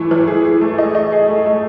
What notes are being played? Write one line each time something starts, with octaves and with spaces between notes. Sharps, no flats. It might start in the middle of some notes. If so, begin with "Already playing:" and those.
Already playing: E3 A3
E3
G#4
G#4
A3
D#5
D#5
G#4
A3
A3